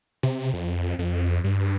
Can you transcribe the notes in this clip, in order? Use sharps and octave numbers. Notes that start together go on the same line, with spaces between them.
C3
F2
F2
G2